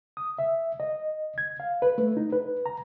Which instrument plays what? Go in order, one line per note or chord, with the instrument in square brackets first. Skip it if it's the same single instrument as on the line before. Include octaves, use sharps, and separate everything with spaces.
[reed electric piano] D#6
E5
D#5
G#6
F5
B4
A3
D#4
B4
A#5